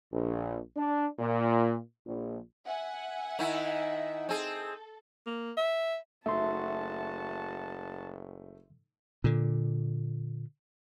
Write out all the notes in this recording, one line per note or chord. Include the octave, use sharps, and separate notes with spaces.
A#1
D4
A#2
A#1
E5 F#5 G#5
D#3 E4
C4 G#4 A4
A#3
E5
F#1 A3 D#4 F#4 E5 A5 C6
A#2 D3